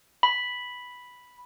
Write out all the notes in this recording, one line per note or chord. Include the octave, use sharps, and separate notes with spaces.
B5